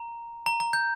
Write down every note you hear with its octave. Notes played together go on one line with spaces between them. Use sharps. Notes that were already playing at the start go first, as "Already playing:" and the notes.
Already playing: A#5
A#5
A#5
G6